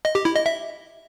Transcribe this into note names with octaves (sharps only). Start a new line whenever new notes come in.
D#5
G4
E4
D#5
E5